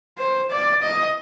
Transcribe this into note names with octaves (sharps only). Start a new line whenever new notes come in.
C5
D5
D#5